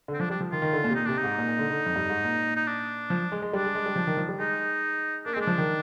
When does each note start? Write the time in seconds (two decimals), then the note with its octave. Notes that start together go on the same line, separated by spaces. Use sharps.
0.08 D3
0.14 C4
0.20 F3 D4
0.30 G3 D4
0.41 F3
0.52 D#3 F4
0.62 D#3
0.73 D3
0.84 A#2
0.90 C3
0.95 A#2 D#4
1.06 C3 D4
1.18 D#4
1.24 G#2
1.38 A#2
1.49 A#2
1.59 D3
1.70 D3
1.86 F2
1.96 G2
2.10 G#2
2.24 A#2
2.56 D#4
2.67 D4
3.10 F3
3.32 G#3
3.42 G#3
3.53 G3 D4
3.64 G#3
3.75 G#3
3.86 G3
3.96 F3
4.07 D#3
4.17 F3
4.29 G3
4.39 G#3 D#4
5.25 A#3 D4
5.33 C4
5.36 G#3 D4
5.47 F3
5.58 D#3